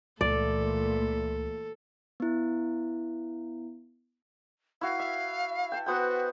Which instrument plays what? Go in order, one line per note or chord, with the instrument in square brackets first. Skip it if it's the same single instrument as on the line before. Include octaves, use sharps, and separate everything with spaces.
[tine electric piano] C#2 [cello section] A#2 E3 A3 [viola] A4 [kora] D5
[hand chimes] B3 E4
[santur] E4 F#4 [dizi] F5
[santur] E5
G5 A5
[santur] B3 C5 G5 [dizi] F#4